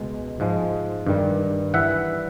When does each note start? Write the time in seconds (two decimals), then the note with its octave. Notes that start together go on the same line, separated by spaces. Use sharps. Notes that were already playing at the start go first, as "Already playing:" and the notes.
Already playing: C#2 B2 G#3
0.40 G#2 F3 G#3
1.06 G2 D#3 G3
1.74 E3 G3 E5 F#5